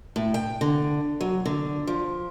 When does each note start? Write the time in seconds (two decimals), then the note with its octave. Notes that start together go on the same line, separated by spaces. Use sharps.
0.16 A2
0.34 G5
0.61 D3
1.21 F#3
1.46 D3
1.87 F3